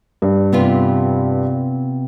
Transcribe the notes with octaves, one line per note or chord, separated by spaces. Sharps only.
G2
C3 B3 F4